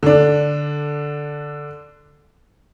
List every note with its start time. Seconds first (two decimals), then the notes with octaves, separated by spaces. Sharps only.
0.03 D3 D4